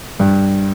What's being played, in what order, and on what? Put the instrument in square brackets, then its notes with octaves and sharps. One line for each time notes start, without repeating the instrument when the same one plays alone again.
[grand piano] G2